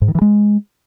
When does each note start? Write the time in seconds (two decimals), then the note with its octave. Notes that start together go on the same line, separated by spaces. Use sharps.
0.02 G#2
0.08 D#3
0.15 E3
0.22 G#3